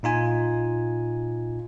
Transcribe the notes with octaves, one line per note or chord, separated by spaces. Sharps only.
A#2 D#4 F4 G#5